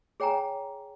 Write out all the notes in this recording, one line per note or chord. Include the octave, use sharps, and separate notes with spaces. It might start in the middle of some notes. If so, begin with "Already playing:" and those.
G#4 C#5 G5 G#5 A#5